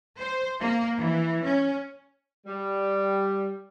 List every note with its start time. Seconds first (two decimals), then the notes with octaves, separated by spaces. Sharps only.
0.18 C5
0.60 A#3
0.97 E3
1.44 C#4
2.46 G3